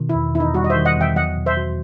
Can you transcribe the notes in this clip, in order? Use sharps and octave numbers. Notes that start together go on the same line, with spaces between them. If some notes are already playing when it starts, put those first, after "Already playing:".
Already playing: B2 D#3
E4
E2
E2 E4
D#4
G3 F#4
D#5
C5 E5
D#3
D#5 F#5
E2
E5 G5
F#3 D#5 F#5
B2
C5 E5
F#4